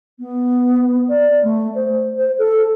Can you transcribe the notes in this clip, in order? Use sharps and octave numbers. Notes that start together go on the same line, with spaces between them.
B3
D5
A3
C5
C5
A4